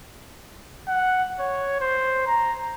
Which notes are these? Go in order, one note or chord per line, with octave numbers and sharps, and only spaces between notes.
F#5
C#5
C5
A#5